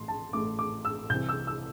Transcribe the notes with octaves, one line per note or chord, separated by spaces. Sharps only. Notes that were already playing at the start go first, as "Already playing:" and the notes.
Already playing: A1 A2 A3 C6
A5
A1 A2 A3 D6
D6
E6
C2 C3 E3 C4 G6
E6
E6